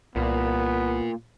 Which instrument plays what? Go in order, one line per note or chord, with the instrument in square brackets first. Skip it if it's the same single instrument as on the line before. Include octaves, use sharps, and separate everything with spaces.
[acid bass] C2 [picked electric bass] A#2 [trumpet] B3